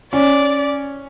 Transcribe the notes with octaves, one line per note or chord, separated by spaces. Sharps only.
C#4 D5